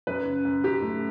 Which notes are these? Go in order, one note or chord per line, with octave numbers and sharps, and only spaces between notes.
F#2 B4
C#3
F#2
F#2 G4
A3